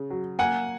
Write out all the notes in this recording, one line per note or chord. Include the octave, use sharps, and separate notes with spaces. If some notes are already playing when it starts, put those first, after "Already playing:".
Already playing: C#3
F#3
A#3 F#5 G#5